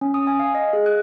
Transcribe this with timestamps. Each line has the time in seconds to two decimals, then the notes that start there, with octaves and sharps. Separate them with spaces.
0.01 C#4
0.14 D#6
0.27 G#5
0.40 F5
0.55 D#5
0.73 G#4
0.86 F#6